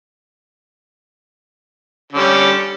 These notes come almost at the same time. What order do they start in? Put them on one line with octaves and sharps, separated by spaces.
D3 C#4 G3